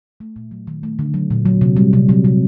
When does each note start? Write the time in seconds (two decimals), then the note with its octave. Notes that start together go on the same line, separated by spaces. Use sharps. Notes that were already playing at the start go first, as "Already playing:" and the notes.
0.20 A3
0.36 A#2
0.51 F#3
0.67 D#3
0.83 A3
0.99 D3
1.14 F#3
1.30 A#2
1.46 F#3
1.61 C3
1.77 G3
1.93 C3
2.09 F#3
2.24 C3